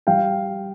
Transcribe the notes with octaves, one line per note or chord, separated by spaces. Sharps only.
G3 F5 G5